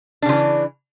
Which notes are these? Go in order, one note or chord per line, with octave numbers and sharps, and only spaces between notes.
C#3 E3 F3 D4